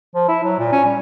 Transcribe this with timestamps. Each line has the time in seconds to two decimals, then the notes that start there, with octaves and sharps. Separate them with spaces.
0.15 F3
0.29 E4
0.44 F#3
0.59 A#2
0.72 C#4
0.86 G3